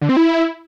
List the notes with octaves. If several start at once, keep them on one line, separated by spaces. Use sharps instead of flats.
D3
C4
E4